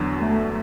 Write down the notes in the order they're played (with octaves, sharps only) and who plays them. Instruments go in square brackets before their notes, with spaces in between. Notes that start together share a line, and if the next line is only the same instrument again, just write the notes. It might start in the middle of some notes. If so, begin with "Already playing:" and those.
Already playing: [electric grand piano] E2 D3 F#3 D4
[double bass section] A3